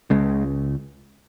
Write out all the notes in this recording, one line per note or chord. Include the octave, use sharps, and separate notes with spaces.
C#2 C#3 G#3